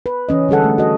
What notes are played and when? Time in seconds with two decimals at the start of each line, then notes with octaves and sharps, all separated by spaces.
0.06 B4
0.29 E3 C#4 D#5
0.49 D3 G3 G#4 A4 F#5
0.64 A3
0.78 F#4 D#5